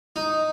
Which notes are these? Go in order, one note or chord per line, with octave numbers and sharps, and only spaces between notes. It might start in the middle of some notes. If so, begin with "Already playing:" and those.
D#4